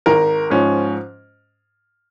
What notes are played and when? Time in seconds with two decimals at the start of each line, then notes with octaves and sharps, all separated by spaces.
0.06 G#1 A#4
0.50 G#2 F3 C#4